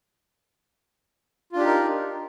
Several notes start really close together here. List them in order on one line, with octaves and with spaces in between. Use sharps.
F4 D4 G4 D#4 A#4